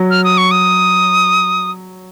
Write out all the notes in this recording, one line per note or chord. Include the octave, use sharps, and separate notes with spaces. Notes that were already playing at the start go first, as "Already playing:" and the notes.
Already playing: F#3
F6
D#6
C#6
D#6